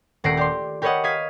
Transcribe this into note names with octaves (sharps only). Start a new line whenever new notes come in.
D#1 A3 F#5 A#6 C7 D7
G4 D5 C6
G4 A#4 B4 C#5 D#5 F#5
F5 D#6 F6 G#6 B6